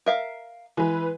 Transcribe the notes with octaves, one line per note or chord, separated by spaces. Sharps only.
A#4 E5 F5
E3 G#3 B4